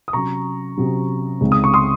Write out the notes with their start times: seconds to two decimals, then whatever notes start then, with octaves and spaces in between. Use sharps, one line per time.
0.08 D#6
0.13 C3 F#3 C#4 A#5 C#6
0.77 C3 F#3 C#4
1.41 C#2 C#3 G#3 C4 D#4
1.52 D#6
1.64 C#6
1.74 C6 D#6